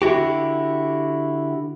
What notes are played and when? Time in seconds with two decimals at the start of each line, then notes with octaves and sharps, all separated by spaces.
0.02 D3 E4 F#4 G4